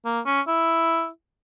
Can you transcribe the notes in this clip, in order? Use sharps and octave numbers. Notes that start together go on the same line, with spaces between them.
A#3
C#4
E4